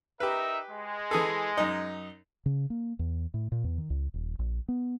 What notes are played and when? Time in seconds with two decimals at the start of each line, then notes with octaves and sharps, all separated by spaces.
0.20 D#4 G4 A#4 B4 E5
0.70 G#3
1.11 E3 G#4 A4
1.57 F#2 D#4
2.46 C#3
2.70 A#3
2.99 E2
3.34 A2
3.52 A#2
3.64 E2
3.78 D#3
3.90 C#2
4.14 D#1
4.39 A#1
4.69 B3